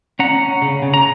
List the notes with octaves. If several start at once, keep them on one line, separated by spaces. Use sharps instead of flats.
C#4 F#5 A#5
C#4
C#3
C#3
A#5